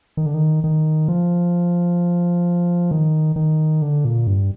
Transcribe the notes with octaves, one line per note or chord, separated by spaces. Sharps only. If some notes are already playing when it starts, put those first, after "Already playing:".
D#3
D3
D#3
D#3
F3
D#3
D#3
D3
A#2
G2